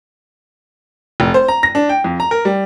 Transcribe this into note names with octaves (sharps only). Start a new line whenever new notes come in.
F1
C5
A#5
A#6
D4
G5
F2
A#5
A#4
G3